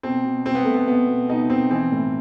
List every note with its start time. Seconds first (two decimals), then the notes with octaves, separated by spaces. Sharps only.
0.03 B2 C4
0.25 B2
0.46 B2 C4
0.55 B3
0.64 B2 A3
0.74 B3
0.88 B2 B3
1.08 B2
1.29 B2 D#4
1.50 B2 C4
1.71 E3 C4
1.92 A2